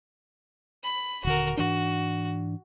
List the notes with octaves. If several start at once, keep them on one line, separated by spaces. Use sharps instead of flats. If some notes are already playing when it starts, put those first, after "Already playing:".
B5
D#1 D3 F#4 A#4
G#2 E3 D4 F#4